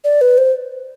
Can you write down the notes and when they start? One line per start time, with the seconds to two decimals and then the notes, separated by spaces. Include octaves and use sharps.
0.04 D5
0.21 B4
0.38 C5